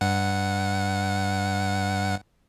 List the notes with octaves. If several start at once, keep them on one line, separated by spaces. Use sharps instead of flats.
G2 F#5